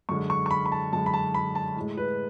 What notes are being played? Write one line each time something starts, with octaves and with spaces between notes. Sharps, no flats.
F#2 D3 G#3 C#6
C#6
C#6
B5
B5
A5
F#2 D3 G#3 A5
B5
A5
B5
A5
A2 G#3
B4